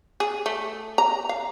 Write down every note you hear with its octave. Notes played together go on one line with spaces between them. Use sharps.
G#4
A3
A#5
F5